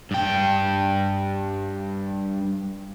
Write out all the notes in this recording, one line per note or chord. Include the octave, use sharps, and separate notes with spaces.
G2 G5